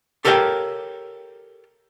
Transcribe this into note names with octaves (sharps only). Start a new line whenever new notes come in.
G4 A4 A#4 C#5 F5 G5